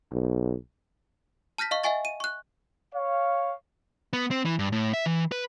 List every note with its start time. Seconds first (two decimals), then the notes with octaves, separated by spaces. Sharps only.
0.12 B1
1.58 A5 F6 G6 A#6 B6
1.71 D#5 F5 C#6
1.83 D#5 E5 F#5 G#5 C#6 A6
2.05 D#7
2.20 C#6 F#6
2.94 C#5 F5
4.13 B3
4.31 C4
4.45 E3
4.59 G2
4.73 A2
4.93 E5
5.06 E3
5.32 B4